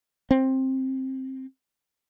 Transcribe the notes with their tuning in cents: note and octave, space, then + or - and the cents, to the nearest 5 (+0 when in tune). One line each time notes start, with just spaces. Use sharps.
C4 +15